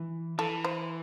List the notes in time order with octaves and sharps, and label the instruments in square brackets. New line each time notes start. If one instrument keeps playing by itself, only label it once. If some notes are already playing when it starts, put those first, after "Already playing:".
Already playing: [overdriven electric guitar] E3
[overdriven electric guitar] E3 [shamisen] A4
[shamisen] C5